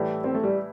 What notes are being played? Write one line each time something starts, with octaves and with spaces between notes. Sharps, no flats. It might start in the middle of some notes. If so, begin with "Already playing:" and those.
Already playing: A2 E3 G3 E4
C4
A3
G3